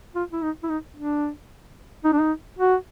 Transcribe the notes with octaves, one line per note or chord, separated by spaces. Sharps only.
F4
E4
D#4
E4
D#4
D4
D#4
D4
D#4
F#4